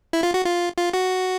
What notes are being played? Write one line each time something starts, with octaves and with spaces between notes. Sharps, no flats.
E4
F4
F#4
F4
F4
F#4